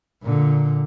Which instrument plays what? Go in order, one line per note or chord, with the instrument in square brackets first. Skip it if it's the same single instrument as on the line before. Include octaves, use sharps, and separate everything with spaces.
[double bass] A#2 D3